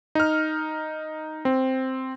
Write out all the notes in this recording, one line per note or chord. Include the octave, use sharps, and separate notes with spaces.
D#4 F6
C4